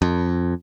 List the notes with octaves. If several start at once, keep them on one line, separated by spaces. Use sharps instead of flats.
F2